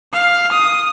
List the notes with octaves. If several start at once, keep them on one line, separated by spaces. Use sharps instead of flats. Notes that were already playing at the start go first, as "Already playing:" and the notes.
F5
D#6